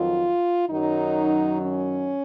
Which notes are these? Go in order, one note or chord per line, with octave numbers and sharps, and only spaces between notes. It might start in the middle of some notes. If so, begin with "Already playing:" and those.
Already playing: F2 D#3 F#3 F4
F#2 D#3 F#3 D#4
C#4